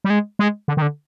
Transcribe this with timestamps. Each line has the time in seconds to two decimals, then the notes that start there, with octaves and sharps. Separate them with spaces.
0.04 G3
0.10 G#3
0.39 G#3
0.68 D3
0.77 D#3
0.82 D3